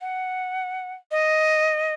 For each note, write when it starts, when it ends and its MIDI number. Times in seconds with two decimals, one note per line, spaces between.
0.01 0.93 78
1.11 1.94 75